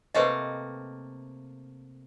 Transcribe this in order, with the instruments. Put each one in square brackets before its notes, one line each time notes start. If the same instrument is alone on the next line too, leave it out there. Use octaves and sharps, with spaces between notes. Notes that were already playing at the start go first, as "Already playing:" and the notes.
[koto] C3 A3 A#3 [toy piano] B4 C5 D#5